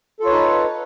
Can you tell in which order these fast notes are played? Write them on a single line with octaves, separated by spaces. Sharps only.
A4 F4 C#5 B4 D#4